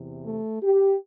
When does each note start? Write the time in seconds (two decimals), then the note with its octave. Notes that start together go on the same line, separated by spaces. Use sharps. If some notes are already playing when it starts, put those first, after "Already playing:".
Already playing: E2 C3 E3
0.26 A3
0.62 G4